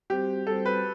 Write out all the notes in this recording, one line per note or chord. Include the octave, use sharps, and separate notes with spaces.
G3 C4 F#4 G4 C5
G3 C4 F#4 A4 C5
B4